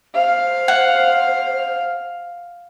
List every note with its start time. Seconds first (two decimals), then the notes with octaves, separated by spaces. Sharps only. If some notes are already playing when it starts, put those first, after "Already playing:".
0.15 C5 F5
0.68 F#5